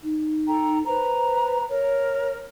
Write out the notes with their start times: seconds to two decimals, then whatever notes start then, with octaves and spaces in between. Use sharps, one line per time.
0.04 D#4
0.47 A4 G5 A#5
0.86 B4 C5 A#5
1.69 A#4 C#5